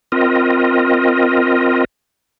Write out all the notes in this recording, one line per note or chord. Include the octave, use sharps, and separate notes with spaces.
C4 F4 A#4 D#5